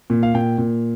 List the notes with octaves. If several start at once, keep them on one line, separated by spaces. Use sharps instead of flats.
A#2
F5
A#2 G5
A#2